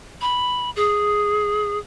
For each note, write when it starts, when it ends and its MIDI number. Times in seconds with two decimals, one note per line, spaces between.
0.21 0.70 83
0.76 1.79 68